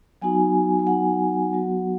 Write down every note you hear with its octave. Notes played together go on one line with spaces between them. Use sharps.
F#3 B3 D#4 F#4 G#5
G#5
F#5
F#3 B3 F#4